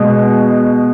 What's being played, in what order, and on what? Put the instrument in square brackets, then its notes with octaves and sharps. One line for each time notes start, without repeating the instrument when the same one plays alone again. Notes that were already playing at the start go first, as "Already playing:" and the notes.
Already playing: [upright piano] B2 G#3